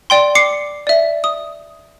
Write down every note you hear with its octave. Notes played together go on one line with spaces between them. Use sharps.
D5 G5 C6
D6 C7 C#7
D5 E5
D#6